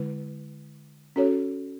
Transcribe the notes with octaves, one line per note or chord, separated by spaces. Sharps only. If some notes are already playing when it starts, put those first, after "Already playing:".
Already playing: D3 G#3 E4 B4
C#4 F#4 A4 C#5